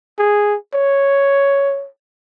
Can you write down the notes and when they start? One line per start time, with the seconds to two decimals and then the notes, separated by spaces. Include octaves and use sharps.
0.18 G#4
0.74 C#5